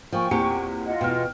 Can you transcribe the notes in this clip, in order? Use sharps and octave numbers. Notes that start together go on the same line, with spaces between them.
F3 A#3 G5 G#5 C#6
E2 A#2 C4 G4 C#7
F4 D#5 F#5
E2 B2 G5 F6